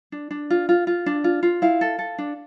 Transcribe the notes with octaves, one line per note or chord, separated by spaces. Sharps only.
D4
D4
F4
F4
F4
D4
F4
F4
E4 F5
A4
A4
D4